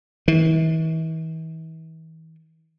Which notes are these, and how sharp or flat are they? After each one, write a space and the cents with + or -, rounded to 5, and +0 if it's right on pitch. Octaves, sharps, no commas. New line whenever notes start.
E3 -40